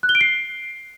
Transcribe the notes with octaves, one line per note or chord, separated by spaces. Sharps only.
F#6
G7
D7
C7